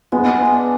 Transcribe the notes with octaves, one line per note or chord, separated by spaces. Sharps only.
G#3 B3
D4